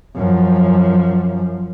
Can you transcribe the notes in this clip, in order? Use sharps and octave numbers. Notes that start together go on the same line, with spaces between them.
F#2 F3